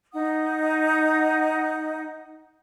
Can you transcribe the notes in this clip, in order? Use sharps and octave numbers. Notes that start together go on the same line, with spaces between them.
D#4 F#5 D#6